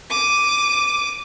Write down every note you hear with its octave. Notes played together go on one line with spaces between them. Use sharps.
D6 D#7